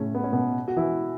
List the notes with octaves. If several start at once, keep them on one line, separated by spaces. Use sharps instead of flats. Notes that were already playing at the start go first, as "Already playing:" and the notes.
Already playing: A2 C#3 A3 C#4
B3
C#4
B2 B3
F#4
E3 E4